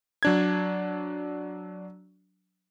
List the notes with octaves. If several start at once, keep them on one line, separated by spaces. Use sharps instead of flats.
F#3 D4 G#6